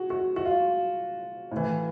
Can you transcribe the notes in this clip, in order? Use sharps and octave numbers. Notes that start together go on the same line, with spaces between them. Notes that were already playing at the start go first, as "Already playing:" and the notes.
Already playing: F#4 G#4
F#4
F#4
F4
A2 E3